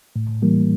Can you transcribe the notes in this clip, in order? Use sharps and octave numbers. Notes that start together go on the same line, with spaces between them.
A2
E3 G3 A#3